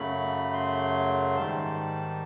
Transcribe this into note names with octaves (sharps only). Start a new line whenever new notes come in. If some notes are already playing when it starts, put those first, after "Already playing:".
Already playing: F#2 C#3 F#3 A3 B5
C6
G#2 D#3 G3 A5